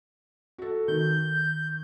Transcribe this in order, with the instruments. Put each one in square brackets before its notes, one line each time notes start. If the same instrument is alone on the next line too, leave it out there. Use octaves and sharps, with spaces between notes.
[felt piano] F#4 A4
[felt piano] D#3 [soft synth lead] G6